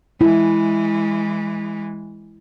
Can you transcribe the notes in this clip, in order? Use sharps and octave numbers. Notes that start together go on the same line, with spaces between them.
E3 G#3 E4